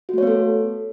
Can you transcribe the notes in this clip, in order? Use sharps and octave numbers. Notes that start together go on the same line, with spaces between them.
A3 B3 F#4 A4 C#5